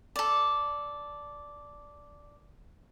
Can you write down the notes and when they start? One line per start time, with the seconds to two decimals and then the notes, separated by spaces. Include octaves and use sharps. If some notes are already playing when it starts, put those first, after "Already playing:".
0.16 A4 D5